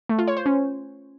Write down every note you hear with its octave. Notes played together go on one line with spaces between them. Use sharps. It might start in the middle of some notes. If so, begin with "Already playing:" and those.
A3
F4
C#5
C5
C#4